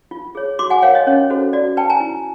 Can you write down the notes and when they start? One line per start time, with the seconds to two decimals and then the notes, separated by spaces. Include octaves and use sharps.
0.11 F4
0.35 G#4 C#5
0.59 F#4 C6 D6
0.70 F#5 G#5
0.82 A#4 C#5 F5 G5
0.95 C#5 D#5
1.07 C#4 C#5
1.30 F#4 A4 C5
1.53 F#4 D5
1.77 B4 G5 A5
1.90 G#5 A#5
2.00 E4